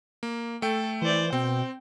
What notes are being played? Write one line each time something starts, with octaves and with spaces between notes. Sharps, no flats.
A#3
A3 A4 G5
E3 C5 D5
B2 C4 G5